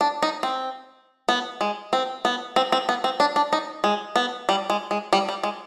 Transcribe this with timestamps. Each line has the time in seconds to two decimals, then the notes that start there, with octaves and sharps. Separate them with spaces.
0.01 D4
0.23 D#4
0.43 C4
1.29 B3
1.61 G#3
1.93 C4
2.25 B3
2.56 C4
2.72 C4
2.89 B3
3.04 C4
3.20 D4
3.36 D4
3.53 D#4
3.84 G#3
4.16 B3
4.49 G3
4.70 G#3
4.91 G#3
5.13 G3
5.29 G3
5.43 G#3